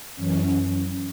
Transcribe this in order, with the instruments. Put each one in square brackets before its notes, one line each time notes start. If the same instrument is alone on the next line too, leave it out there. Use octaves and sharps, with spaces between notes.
[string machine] F#2 E3 C#4